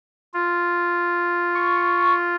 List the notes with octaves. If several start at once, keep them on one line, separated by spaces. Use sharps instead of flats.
F4
C#6